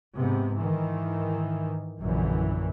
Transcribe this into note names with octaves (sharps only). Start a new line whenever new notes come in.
G#2 C3 B3
G#2 D#3 E3
A#1 F#2 D3 E3